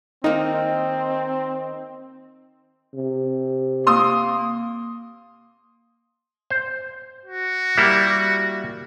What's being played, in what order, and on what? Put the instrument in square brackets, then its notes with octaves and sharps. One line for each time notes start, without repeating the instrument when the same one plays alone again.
[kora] D#3 A#3 [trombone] C4 [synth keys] D#4
[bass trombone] C3
[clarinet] A#3 [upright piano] C6 D#6
[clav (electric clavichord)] C5
[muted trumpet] F#4
[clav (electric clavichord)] G3 A#3 E4